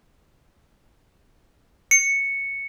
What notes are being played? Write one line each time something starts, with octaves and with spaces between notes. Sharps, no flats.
C#7